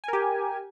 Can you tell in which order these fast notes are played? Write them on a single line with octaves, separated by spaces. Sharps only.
G#5 A#4 G4